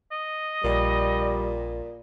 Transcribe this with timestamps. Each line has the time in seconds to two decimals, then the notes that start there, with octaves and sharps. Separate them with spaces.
0.12 D#5
0.64 A#1 A#2 G3